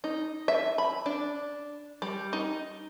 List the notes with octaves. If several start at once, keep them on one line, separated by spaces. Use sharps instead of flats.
D#4
E5
B5
D4
G3
D#4